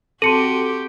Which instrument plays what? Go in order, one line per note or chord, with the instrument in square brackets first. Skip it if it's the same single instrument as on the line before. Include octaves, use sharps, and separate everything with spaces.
[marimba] C4 A5 [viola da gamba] F#4 G4 [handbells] A4 [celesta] C6 C#7 D#7